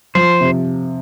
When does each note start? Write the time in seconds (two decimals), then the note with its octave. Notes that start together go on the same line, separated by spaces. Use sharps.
0.15 F3 C5
0.41 C3